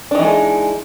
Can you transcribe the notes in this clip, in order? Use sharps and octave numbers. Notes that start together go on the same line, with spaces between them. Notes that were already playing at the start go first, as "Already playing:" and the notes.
E3 G#3 D4 D#4